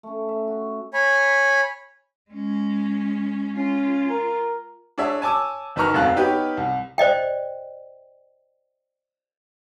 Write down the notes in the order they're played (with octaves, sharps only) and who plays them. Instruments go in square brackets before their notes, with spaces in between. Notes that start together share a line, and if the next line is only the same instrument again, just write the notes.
[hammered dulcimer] A3 C#4
E5
F#4
[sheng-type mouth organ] C#5 G#5 B5
[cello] G#3 C#4
[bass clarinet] C#4 [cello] F4
[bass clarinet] A#4
[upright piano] D4 G#4 C#5 E5
C#5 G#5 A5 D6 E6
F#1 D#3 B4 A#5 C#6 F6
E1 F#2 A3 C4 F5 F#6
B3 D#4 G4 B4 C#5
C2
[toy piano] C5 D5 D#5 G5